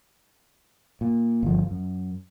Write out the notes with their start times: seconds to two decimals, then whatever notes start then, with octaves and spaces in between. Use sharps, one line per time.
1.01 A#2
1.43 G1 F3
1.71 F#2